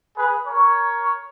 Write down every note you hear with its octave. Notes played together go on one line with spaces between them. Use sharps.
G#4 B4
A#4 C#5